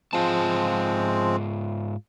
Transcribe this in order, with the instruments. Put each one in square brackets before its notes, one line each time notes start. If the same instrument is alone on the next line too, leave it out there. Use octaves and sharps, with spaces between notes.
[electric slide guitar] G#2 F4 A5 [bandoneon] F3 G#3 C4